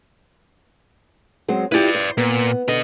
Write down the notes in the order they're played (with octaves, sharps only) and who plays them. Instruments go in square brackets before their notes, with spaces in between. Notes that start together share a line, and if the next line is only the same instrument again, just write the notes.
[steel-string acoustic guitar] F#3 G#3 C4
[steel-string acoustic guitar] E4 F4 G4 [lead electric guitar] B4 D5
[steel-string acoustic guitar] C5
[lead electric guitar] A#2 [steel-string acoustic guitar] B3
[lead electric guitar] B2 D#5 [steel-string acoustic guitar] D3